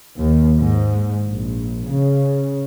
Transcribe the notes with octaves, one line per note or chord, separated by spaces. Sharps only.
D#2
G#2
A#1
C#3